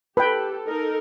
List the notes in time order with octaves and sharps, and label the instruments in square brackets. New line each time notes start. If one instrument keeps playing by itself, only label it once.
[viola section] G4 A4 [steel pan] B4 G5
[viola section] D#4 A4 A#4